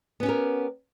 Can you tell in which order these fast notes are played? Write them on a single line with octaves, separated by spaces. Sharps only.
B3 C#4 G4 A#4